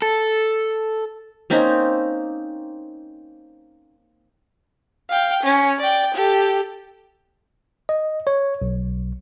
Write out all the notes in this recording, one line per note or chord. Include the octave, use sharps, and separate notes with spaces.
A4
A#3 C4 C#4 D#4
F5 G5
C#4
D5 G5
G4 A4
D#5
C#5
B1